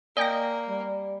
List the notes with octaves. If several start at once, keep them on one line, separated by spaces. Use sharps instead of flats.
A#3 D5 D#5 G5 G#5 A#6
G3